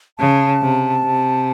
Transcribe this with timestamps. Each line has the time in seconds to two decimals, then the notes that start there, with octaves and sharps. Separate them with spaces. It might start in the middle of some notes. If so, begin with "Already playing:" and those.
0.19 C#3 A5
0.62 C3
1.05 C3